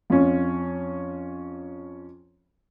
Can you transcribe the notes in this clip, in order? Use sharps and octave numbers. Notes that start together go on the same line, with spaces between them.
F2 C#4